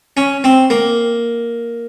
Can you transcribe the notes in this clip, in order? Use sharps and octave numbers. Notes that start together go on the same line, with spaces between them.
C#4
C4
A#3